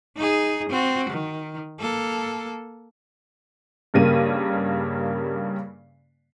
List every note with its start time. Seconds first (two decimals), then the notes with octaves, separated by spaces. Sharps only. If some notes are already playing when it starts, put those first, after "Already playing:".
0.17 D#4 G#4
0.69 C4 F#4
1.10 D#3
1.80 A#3 A4
3.94 G2 C#3 G3 A#3 D#7